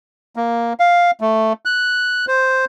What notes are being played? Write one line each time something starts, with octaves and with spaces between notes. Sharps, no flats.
A#3
F5
A3
F#6
C5